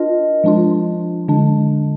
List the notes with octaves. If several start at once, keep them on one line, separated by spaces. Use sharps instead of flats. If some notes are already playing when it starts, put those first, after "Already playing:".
Already playing: D4 F4 A#4 D#5
F3 G#3 D4 F4
D3 G#3 D4